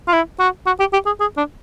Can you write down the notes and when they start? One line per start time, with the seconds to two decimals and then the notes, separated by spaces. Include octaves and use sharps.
0.08 F4
0.13 E4
0.40 F#4
0.66 F#4
0.80 G4
0.93 G4
1.06 G#4
1.20 G#4
1.37 D4